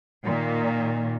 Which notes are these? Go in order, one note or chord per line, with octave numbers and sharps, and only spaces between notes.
A#2 D#3